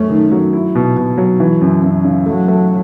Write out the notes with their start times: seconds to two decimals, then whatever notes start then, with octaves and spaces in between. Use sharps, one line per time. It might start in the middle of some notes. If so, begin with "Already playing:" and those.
Already playing: F#2 A3 C#4
0.10 D#3
0.31 F#3
0.53 E4
0.75 B2
0.97 B2
1.18 F#3
1.40 E3
1.61 F#2
1.83 F#2
2.05 C#3
2.26 F#3 A3
2.48 A3